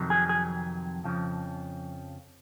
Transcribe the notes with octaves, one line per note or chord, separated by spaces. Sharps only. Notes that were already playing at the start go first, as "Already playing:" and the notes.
Already playing: F2 C3 D#3 F#3
G#4
G#4
F2 C#3 F3